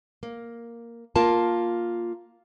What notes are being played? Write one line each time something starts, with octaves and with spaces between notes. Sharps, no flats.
A#3
A#3 F4 A#4 A5